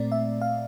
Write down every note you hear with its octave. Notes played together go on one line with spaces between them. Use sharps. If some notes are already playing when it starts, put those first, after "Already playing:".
Already playing: A#2 A3 C4 D5
E5
F5